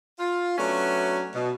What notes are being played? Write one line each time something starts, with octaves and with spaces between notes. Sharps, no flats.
F4
F#3 A3 B3 C#4 D4
B2